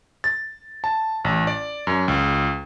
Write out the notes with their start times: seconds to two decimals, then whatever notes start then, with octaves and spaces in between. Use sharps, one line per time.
0.24 A6
0.84 A5
1.25 A1
1.47 D5
1.87 F#2
2.08 C#2